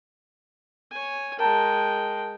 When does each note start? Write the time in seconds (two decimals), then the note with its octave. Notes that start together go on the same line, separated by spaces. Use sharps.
0.91 C#5 G#5
1.39 G#3 A#4 G5 A5 A#5